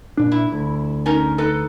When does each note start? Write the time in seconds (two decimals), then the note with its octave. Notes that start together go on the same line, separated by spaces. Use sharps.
0.17 A#2 D4
0.32 E4
0.52 D2
1.06 C#4 D#4 A#4
1.38 D#4 A4 B4